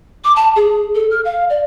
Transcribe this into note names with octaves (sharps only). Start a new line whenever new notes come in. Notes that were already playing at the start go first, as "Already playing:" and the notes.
D6
A5
G#4
A4
F6
F5
D5